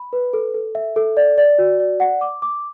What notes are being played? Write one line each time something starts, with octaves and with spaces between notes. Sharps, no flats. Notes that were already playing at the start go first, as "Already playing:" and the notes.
Already playing: B5
B4
A4
A4
E5
A4
D5
D5
F#4
D5
F#5
D6
D6